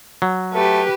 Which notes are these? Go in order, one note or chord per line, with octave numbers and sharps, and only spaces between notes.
F#3
A3 G4 B4